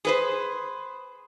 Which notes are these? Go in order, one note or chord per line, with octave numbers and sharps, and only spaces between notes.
G#4 B4 C5